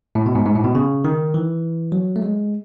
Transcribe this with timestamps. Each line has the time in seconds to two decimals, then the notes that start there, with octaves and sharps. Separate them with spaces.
0.15 A2
0.26 B2
0.35 G#2
0.46 G#2
0.55 A2
0.64 B2
0.75 C#3
1.04 D#3
1.34 E3
1.92 F#3
2.16 A3
2.22 G#3